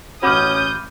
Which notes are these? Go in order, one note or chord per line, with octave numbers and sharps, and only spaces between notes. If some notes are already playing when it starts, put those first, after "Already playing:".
A1 C#4 F#4 B5 D6 D#6 F6 G6